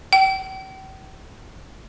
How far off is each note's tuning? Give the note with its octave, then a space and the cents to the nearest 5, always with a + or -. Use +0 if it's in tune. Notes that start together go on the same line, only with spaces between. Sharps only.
G5 -45